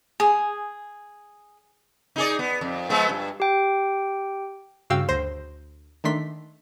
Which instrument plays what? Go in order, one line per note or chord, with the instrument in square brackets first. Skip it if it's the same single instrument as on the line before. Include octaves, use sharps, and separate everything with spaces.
[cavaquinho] G#4 [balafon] G#5
[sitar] D#4 G#4 D5
B3
F2
F3 G#3 B3
G2
[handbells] G4 G5
[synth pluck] G2 C#3 F#4 F5 G5 E6
D2 C5 A#6
D#3 A3 D4 C6 B6